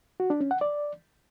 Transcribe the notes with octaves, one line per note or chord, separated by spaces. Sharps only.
F#4
D4
C#4
F#5
D5